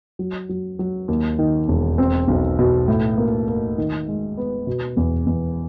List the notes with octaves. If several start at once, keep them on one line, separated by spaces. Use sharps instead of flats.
F#3
F#3
F#3
D#2
D#3
E1
C4
B1
B2
A2
A#3
A#3
D#3
G#3
B3
B2
E2
E2